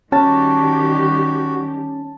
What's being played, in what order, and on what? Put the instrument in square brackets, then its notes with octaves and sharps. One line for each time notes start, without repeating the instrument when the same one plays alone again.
[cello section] D#3 G3 G4 [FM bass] C#4 [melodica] F#4 [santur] A5